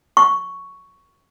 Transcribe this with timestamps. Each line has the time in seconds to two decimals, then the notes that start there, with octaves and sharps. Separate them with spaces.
0.17 C#6